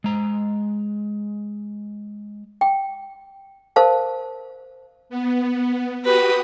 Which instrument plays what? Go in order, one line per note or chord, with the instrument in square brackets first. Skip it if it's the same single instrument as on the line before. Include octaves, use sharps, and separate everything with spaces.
[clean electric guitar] G#3 A#5
[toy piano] G5
A#4 C5 F5 A5
[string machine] B3
[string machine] F#4 G4 D#6 [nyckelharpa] B4